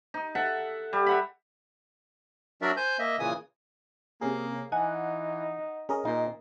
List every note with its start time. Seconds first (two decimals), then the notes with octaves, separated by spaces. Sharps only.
0.14 D#4
0.35 A4 E5 F#5
0.93 G3
1.06 E5 F#5 B5
2.62 F#3 D4 F#4 A#4 D5 E5
2.77 C5 G#5 G6
2.99 A#3 D#5 E5
3.20 A#2 C#3 E3 G#5 D#6
4.21 C3 A#3 C#4 G#4
4.72 E3 D#4 F#5 G#5
5.89 C#4 G#4 A#4 D#5
6.05 A#2 D#4